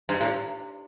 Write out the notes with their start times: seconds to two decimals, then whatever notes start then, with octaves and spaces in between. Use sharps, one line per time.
0.09 G2
0.21 A2